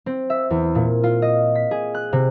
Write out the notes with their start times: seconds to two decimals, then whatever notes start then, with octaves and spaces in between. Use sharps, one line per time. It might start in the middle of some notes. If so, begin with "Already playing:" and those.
0.06 C4
0.30 E5
0.50 E2
0.75 A#2
1.04 F4
1.22 D#5
1.55 B6
1.71 G#4
1.95 F#6
2.13 C3